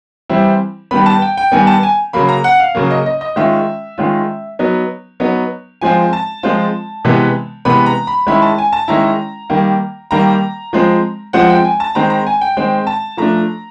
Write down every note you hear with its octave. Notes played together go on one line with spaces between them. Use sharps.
E3 G3 C4 E4
D#3 G3 B3 B5
A5
G5
G5
D#3 G3 B3 G#5
A5
G#5
C#3 F#3 A#3 B5
A#5
F#5
F5
C#3 F#3 A#3
D#5
D#5
D#5
D#3 G#3 C#4 F4 E5
D#3 G#3 C#4 F4
F#3 B3 D#4
F#3 B3 D#4
F3 G#3 C4 F4 G#5
A5
F3 G#3 C4 F4
C3 E3 G#3 B3
C3 E3 G#3 B3 B5
A#5
B5
D#3 G#3 C#4 E4 B5
A5
G#5
A5
D#3 G#3 C#4 E4 A#5
D#3 G3 A#3
D#3 G3 A#3 A#5
F3 G#3 C4
F3 G#3 C4 F#5
G5
G#5
A5
D#3 G#3 C4 A#5
A#5
G#5
G5
D#3 G#3 C4 G5
A5
F3 A3 D4 A#5